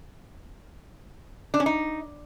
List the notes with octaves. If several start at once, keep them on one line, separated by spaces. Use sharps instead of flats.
D4
C#4
D#4